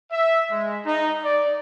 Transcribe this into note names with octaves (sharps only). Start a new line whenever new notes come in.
E5
G#3
D#4
D5